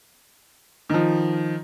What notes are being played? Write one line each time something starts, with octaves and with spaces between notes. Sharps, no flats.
D#3 F3